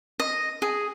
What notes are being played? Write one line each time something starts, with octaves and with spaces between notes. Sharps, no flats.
D#5
G#4